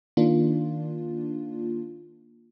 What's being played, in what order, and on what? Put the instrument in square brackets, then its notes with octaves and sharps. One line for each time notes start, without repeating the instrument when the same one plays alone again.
[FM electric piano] D#3 A#3 D4 F4